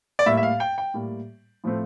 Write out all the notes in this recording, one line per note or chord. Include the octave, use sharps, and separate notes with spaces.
D5
A2 G3 A#3 E5
E5
F5
G5
G5
A2 G3 A#3
A2 F3 A3 C4